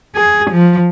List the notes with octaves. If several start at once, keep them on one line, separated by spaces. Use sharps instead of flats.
G#4
F3